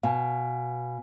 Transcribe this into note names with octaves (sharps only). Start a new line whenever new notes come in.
B2 F5 G#5